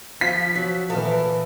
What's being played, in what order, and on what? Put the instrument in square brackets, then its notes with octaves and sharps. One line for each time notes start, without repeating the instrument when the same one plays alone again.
[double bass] F3 [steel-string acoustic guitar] F4 [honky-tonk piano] B6
[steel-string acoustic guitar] F#3
[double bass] A#2 E3 [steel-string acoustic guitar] F3 A4 A#4